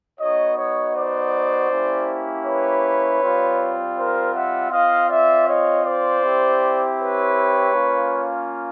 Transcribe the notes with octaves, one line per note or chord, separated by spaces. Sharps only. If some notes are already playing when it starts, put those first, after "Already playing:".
B3 D#4 F#4 C#5 D#5
C#5 D#5
C5 D5
A#3 C#4 E4 G4
B4 C#5
G3 C4 F4
A#4 C5
E5 F#5
C4 F4 D#5 F5
D5 E5
C#5 D#5
C5 D5
C4 E4 G4
B4 C#5
A#3 C#4 F4